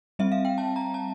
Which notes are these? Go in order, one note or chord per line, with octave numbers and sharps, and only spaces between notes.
G3 C4 E5
F5
G5
A5
A#5
A5